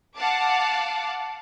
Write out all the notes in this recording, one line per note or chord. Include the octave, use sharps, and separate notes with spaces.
F5 F#5 A5 D6